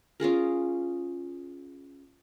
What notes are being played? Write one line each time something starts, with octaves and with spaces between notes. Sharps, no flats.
C#4 F4 G#4 A#4